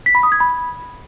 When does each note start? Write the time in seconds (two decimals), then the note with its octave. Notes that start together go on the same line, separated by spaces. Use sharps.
0.06 B6
0.15 B5
0.23 D#6
0.32 G#6
0.40 B5